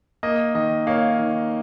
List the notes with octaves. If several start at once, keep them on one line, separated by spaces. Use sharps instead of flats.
A#3 D#5
D#3 D#5
A#3 C#5 F5
D#3